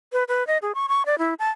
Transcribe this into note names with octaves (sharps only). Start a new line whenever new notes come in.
B4
B4
D#5
G#4
C#6
C#6
D5
E4
A5